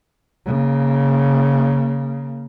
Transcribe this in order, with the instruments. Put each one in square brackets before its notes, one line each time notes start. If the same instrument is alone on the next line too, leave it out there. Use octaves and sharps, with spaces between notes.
[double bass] C#3 A#3